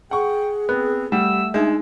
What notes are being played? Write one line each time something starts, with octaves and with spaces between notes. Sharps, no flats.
G#4 F#5 G5 C#6
B3 C4 F#6
G3 A3 F#5 E6
G#3 D4 D#4 E5